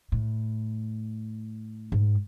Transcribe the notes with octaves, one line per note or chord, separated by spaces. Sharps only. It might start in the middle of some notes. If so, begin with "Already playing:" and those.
A2
G#2